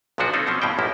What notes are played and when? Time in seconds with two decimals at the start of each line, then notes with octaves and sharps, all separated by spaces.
0.18 B1 A#2 D3 F3 D4 F#4
0.33 A3 C4 C#4 D#4 A4
0.47 B2 F3 C4 C#4
0.62 G2 B2 E3 C4 C#4 G5
0.79 A1 F#2 F3 A#3 E4